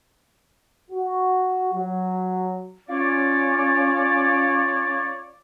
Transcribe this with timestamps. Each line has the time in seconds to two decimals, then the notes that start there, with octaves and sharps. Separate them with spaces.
0.91 F#4
1.73 F#3
2.89 C#4 F4 C#5 D5